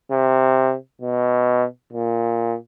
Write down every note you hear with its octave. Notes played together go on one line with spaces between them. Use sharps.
C3
B2
A#2